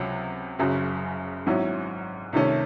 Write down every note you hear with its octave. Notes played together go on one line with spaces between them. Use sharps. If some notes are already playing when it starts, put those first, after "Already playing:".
Already playing: C#2 C3 F#3 C#4 F#4
F#1 F#2 C#3 F#3
G#1 G#2 F#3 C#4 E4
C2 C3 D#3 A3 C#4